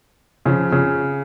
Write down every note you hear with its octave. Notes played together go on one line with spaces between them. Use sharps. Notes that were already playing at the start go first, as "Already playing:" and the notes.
C#3 F3
C#3